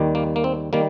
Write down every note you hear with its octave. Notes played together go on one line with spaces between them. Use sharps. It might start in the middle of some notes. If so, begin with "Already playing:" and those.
Already playing: D#2 D#3 G3
A#3
A#3
C4
D#3 G3 A#3